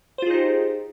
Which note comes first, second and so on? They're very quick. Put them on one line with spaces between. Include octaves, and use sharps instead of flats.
C5 F4 G#4 D#4 G4